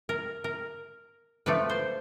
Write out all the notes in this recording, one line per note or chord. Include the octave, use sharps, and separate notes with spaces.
A#4
A#4
F3 A3 D4 B4
C5